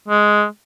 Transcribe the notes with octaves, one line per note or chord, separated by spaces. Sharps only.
G#3